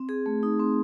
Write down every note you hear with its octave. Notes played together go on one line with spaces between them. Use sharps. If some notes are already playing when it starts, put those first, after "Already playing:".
Already playing: C4
G#4
A3
D#4
C4